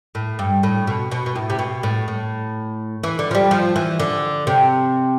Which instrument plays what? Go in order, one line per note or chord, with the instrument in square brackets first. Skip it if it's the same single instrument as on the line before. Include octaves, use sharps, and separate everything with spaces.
[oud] A2
G2
A2
B2
B2
B2
A2
C3
B2
A2
A2
E3
D3
F3
G3
F3
E3
D3
C3